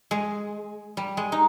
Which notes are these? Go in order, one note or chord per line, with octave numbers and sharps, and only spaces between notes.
G#3
G3
G#3
D#4